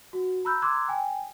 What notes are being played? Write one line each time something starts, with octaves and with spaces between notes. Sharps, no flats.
F#4
A#5 B5 E6 F#6 G6
A#5 C6 D6 E6 F#6 G#6
G5 G#5